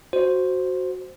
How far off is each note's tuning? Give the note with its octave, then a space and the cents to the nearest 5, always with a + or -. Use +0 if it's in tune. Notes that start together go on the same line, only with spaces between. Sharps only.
F#4 +0 C5 +0